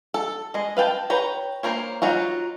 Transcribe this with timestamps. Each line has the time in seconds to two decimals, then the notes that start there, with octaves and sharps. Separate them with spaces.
0.14 A4
0.54 G#3 D#5
0.77 B4 F5 G5 A5
1.10 B4 C#5 G5 A#5
1.63 A#3 C4 A#4 C5 C#5
2.02 F#3 D#4 F4 F#4